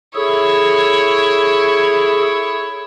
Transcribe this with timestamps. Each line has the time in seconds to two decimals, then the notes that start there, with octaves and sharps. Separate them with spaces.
0.15 E4 G#4 A4 C#5